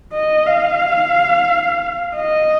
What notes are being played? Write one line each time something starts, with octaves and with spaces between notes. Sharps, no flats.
D#5
F5
D#5